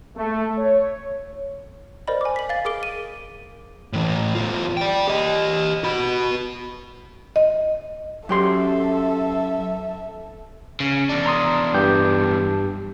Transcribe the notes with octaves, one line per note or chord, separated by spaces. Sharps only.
A3
C#5
A#4 C5 D5 D#5 B5
G#5 D6
B6 F#7
F5 A6
G#4 A#4 D6 D7 G7
D#7
A2 E3
E2 F4
D5 G5
G4 D#5
F#4 B5
D#5
F#2 G4 A4 E5 C6
C#3
E2 D4
A#5 C6 D#6
G2 G4 G6